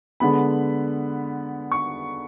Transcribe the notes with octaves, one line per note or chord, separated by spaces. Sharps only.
D3 G#3 B3 B5
C#6